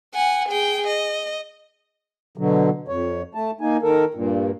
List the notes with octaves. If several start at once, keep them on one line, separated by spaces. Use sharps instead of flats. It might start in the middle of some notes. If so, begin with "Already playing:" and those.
F#5 G#5
G#4 G5
D#5
B2 D3 F#3
F2 C#5
A3 A5
A#3 D#4 G#5
D#3 A4 A#4
G2 A#2